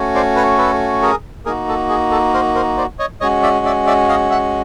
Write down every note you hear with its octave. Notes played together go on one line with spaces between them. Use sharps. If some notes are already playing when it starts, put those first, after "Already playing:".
Already playing: A3 C#4 F#4
C5 D5
B4 C#5
A4 B4
G#4 A#4
A#3 D#4 F#4 G#4 A#4
A4
G#4
A4
A#4 C5
A#4 C5
C5 D5
C#5 D#5
G#3 C#4 F#4 C#5 D#5
D5 E5
D5 E5
D5 E5
D#5 F5
E5 F#5